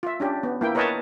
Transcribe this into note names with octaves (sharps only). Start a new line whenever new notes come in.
F4 E5
C#4 D4 G4
B3
A#3 E4 G5
A#4 B4 C#5 D#5 G5 A5